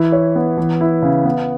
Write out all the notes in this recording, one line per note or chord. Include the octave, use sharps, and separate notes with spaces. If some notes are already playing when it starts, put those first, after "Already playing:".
Already playing: E3 E4
C#5
B3
E3
E4
C#3
B3